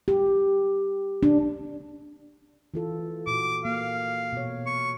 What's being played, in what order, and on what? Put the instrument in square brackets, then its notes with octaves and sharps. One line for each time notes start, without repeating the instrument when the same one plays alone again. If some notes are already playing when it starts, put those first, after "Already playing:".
[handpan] G4
D4
E3 F4 A4
[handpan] A#2 F#4 [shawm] D6
[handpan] A#3 [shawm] F5
[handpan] B2 C#5
[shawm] C#6